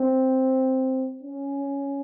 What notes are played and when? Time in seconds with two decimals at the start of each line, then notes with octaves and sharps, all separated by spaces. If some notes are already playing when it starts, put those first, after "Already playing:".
Already playing: C4
1.23 C#4